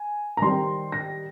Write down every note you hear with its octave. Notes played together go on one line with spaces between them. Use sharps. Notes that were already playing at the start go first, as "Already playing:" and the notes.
Already playing: G#5
A#5
D#3 G3 C4 C6
A#6